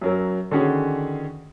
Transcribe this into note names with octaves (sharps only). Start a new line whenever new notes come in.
F#2 F#3 A#4
D3 D#3 C#4 F#4 G#4